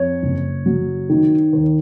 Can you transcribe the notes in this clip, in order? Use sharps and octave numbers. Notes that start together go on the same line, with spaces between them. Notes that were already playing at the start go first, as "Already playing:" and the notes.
Already playing: F2 C#5
F#1
F#3
D#3
D#2